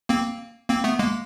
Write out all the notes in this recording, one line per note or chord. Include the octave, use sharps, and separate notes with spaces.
A#3 C4
A#3 C4
A3 B3
G#3 A#3